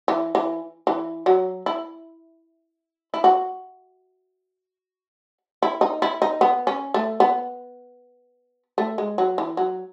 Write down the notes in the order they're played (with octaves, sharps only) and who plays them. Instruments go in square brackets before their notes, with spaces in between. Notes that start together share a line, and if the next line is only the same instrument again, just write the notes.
[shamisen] E3
E3
E3
F#3
E4
E4
F#4
E4
D#4
E4
D#4
B3
C#4
A3
B3
A3
G#3
F#3
E3
F#3